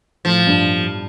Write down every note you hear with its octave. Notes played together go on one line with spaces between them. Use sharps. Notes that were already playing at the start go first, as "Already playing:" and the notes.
A2 F3
G2